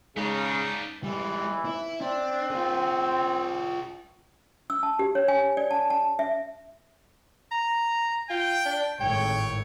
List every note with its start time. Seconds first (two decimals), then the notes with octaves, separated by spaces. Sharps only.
0.17 C#3 G#3 B3 D4 D#4
1.04 E3 G3 G#3
1.65 E4
2.01 C4 D4
2.50 F4 G#4
4.70 E6
4.83 A5
4.99 G4
5.15 C#5
5.28 G#5
5.57 D5
5.71 A5
5.90 A5
6.19 E5
7.51 A#5
8.30 F4 G5
8.65 D4
9.00 G#1 A2 C#5 G5